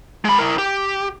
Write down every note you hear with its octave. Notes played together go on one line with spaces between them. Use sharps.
G#3 B5
E4 A#4
G4